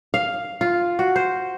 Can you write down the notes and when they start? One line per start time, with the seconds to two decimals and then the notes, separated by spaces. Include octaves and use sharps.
0.14 F5
0.61 F4
0.99 F#4
1.16 C5